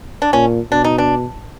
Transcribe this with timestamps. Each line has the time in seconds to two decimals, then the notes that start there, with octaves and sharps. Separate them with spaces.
0.22 D4
0.33 A#2 C#4
0.71 B2 D4
0.84 D#4
0.98 D4